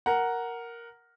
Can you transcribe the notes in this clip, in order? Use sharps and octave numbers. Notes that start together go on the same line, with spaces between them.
A#4 F#5